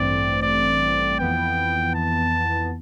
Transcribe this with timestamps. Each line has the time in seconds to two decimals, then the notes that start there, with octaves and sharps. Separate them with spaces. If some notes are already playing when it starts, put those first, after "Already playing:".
Already playing: A1 G2 E3 A3 C4 D5
0.43 D5
1.19 F2 E3 B3 G5
1.95 A5